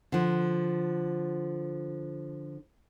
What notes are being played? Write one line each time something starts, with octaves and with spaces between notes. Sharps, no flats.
D3 F3